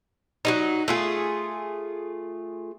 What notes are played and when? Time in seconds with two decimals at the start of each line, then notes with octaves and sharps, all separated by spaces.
0.45 F#3 G#3 D#4
0.88 A3 F4 G#4